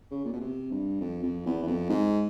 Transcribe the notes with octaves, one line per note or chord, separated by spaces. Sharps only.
C#3
A#2
B2
C3
G2
F2
F2
E2
E2
F2
G#2